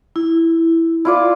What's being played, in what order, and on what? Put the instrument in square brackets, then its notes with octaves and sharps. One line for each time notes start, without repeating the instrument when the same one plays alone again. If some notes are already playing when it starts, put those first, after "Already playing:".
[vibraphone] E4
[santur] E4 F4 D5